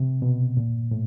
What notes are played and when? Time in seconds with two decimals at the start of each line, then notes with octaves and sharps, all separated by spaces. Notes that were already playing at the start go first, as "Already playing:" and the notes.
Already playing: C3
0.22 B2
0.57 A#2
0.91 A2